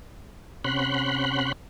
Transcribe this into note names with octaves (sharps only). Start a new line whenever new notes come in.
C3 C#4 F#5 B5 C6 F#6